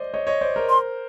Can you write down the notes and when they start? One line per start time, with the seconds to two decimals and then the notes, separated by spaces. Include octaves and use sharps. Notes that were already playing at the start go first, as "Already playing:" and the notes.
Already playing: C5 D5 D#5
0.14 C#5 D#5
0.27 C#5 D#5
0.41 C5 D5
0.56 A#4 C5
0.69 C6